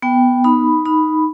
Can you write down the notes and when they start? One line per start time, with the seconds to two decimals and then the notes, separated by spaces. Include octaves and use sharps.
0.02 B3 G5
0.44 D#4 B5
0.85 D#4 B5